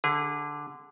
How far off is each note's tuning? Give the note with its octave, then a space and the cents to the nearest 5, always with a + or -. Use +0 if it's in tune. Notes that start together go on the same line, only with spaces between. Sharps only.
D3 +0 G#4 -30